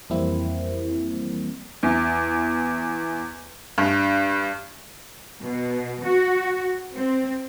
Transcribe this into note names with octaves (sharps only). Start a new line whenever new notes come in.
F2 E3 G3 A#3 C4 E4
E2
G2
B2
F#4
C4